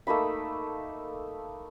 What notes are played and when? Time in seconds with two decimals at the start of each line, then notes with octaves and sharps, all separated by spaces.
0.07 A3 A#3 D#4 B5